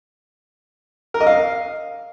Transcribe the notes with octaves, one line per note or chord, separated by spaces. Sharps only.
A#4
D#5
F5